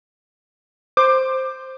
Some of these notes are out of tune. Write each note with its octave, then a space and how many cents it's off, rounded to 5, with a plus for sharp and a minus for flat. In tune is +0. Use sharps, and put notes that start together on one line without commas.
C5 +0 D6 +20